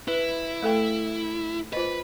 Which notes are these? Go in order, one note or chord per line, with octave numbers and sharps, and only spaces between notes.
E4 B4
A3 A4 G5
F4 B4 C5 D#5